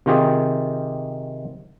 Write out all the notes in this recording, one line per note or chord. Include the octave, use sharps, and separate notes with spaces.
C3 D#3 F4 G4 G#4